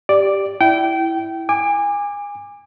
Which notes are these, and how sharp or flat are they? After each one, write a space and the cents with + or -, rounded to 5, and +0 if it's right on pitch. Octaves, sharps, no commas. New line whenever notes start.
G4 +0 D5 +0
E4 +0 G5 -25
G#5 -25 D6 +15